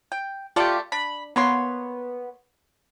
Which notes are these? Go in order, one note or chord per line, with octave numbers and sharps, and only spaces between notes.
G5
A3 F4 G4 A4 D5
D4 B5
A#3 B3 C#5 C6